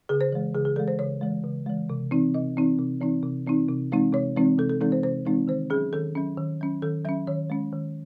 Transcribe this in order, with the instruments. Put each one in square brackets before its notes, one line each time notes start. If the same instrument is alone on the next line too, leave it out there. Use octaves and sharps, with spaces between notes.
[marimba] C#3 G#4
C5
E3 G#3
C#3 G#4
G#4
E3 G#3 A4
C5
C#3 C#5
E3 G#3
C#3
E3 G#3
C3
E3 C4 D#4
C3 D#5
E3 C4 D#4
C3
E3 C4 D#4
C3
E3 C4 D#4
C3
E3 G#3 C4 D#4
C3 C#5
E3 G#3 C4 D#4
C3 A4
A4
E3 G#3 C4 D#4 A4
C5
C3 C5
E3 G#3 C4 D#4
D#3 C5
F#3 C#4 G#4
D#3 A4
F#3 C#4
D#3
F#3 C#4
D#3 A4
F#3 C#4 E5
D#3 C#5
G#3 C#4
D#3